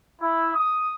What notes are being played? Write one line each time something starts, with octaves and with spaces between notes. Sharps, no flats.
E4
D#6